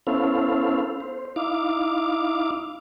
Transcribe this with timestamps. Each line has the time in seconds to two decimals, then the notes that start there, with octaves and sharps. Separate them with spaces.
0.07 B3 C#4 E4 A4 C5 F5
1.00 C5
1.36 D#4 E4 F5 D6